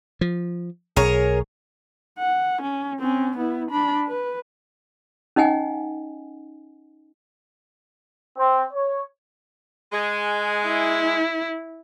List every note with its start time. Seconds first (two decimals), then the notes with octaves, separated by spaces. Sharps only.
0.21 F3
0.96 B1 G#4 A#4 C#5
2.19 F#5
2.63 C#4
2.99 C4 C#4
3.37 B3 E4
3.71 D4 B5
4.07 B4
5.36 C#4 D#4 D#5 F#5 G#5
8.38 C4
8.74 C#5
9.93 G#3
10.67 E4